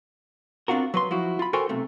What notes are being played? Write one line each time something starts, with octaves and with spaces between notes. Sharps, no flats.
C4 D4 F4 F#4 A#4
F#3 B4 C6
F3 F#3 E4 F#4
F4 B5
F#4 A4 A#4 C5 G5 G#5
B1 C3 A3